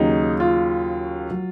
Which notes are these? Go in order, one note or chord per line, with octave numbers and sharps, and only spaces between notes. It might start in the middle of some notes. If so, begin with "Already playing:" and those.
Already playing: D#2 C#3 F#3 D#4
F4
F#3